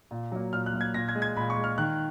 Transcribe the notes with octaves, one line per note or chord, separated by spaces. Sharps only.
A#2
F#3 A#3
A#2 F6
F#6
F#3 A#3
G#6
A#2 A#6
G#6
G#3
G#6
A#2 B5
C#6
G#3
F6
D#3 F#6